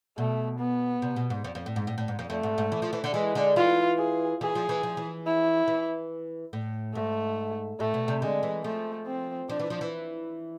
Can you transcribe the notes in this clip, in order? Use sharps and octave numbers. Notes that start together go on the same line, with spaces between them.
B2 A3
B3
C3
B2
G#2
F2
F2
A2
G#2
A2
A2
G#2
F2
F2 A3
G#2
G#2
E3
F3
E3
D3
E3 G#3
D3
E3 F4
G#4
E3 G#4
F3
E3
F3
E3
E4
E3
A2
G#2 A3
A2 A3
B2
C3
D3 G#3
E3
F3 A3
C4
F3 D4
E3
F3
E3